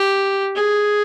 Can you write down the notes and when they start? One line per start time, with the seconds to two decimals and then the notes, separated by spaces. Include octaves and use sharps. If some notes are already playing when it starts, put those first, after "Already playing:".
Already playing: G4
0.56 G#4